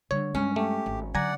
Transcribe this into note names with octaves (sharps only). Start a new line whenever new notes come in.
D3 G3 C#5
G2 G#3 C#4
A3 G4
G#1
D3 F#3 D5 F#5 G#5 A#5